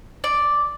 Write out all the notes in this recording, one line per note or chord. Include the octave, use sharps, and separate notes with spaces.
D5